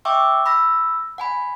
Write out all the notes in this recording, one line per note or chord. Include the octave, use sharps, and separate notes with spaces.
E5 G5 C#6 D6 E6
B5 E6 A#6
F#5 G#5 B5